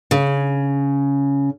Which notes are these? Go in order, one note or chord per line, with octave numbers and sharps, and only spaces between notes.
C#3